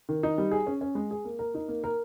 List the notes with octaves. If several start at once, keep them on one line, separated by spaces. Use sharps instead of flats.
D#3
D#4
G3
G#4
C#4
C#4
G#3
G#4
A#3
A#4
D#4
A#3
A#4